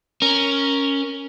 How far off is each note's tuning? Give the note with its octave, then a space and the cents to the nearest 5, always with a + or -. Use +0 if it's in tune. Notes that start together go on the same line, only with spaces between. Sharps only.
C#4 +0 A#4 +0